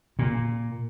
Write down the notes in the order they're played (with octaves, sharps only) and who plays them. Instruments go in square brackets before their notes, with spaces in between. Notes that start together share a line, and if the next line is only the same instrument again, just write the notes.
[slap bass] A#2